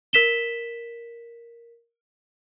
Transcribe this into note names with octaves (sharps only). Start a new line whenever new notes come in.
A#4 B6 E7 G7